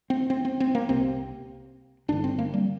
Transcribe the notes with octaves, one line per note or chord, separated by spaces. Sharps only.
C4
C4
C4
C4
A#3
C2 C3 C4
G1 G2 D3 D4
C4
A#3
G3